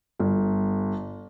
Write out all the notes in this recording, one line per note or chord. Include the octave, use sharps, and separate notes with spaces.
G1